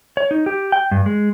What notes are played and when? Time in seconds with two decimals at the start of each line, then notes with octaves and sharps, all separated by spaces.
0.17 C#5
0.31 D#4
0.46 G4
0.72 G5
0.91 G2
1.06 G#3